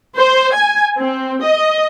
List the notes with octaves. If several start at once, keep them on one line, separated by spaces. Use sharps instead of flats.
C5
G#5
C4
D#5